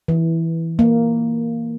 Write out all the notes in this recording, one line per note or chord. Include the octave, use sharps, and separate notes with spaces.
E3
A#3